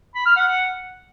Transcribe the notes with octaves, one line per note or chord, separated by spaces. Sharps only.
B5
F6
F#5